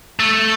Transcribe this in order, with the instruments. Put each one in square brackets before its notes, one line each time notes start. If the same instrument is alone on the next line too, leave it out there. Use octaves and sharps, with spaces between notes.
[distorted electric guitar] A3